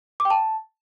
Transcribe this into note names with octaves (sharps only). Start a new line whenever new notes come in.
D6
G5
A5